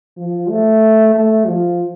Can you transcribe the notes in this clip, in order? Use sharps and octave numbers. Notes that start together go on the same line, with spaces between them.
F3
A3
A3
F3